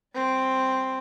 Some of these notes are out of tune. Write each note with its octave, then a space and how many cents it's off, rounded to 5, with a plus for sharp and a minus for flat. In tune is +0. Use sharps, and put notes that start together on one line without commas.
G3 +0 C4 +0